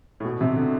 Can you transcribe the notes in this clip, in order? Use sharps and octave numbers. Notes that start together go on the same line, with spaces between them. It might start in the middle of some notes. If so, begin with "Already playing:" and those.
A2
B2
C3
D3